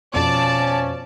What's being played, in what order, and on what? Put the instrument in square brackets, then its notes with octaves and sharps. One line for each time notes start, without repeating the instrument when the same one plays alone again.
[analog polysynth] F2 B2 [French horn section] F3 C#4 [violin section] D5 A5